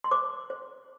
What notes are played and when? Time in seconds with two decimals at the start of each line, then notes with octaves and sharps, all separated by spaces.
0.04 C6
0.11 C5 D6
0.50 C5